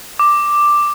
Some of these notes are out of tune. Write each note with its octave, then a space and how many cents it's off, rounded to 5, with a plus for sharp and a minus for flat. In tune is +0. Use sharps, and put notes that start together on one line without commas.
D6 +5